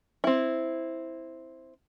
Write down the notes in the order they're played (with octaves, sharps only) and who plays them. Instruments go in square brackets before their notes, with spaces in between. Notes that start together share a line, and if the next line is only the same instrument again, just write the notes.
[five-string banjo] C4 E4